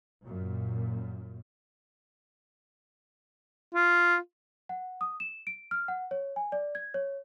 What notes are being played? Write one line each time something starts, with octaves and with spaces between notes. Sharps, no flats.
F#2 A#2
F4
F#5
D#6
E7
D7
F6
F#5
C#5
G#5
D5
G#6
C#5